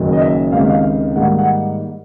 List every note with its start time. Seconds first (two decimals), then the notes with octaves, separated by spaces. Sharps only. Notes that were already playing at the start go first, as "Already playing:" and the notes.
Already playing: F#1 F#2 D#3
0.13 D#5
0.21 E5
0.52 C#2 C3 D#3 F5
0.61 E5
0.69 F5
1.16 G#2 D#3 G3 A#3 F#5
1.39 F#5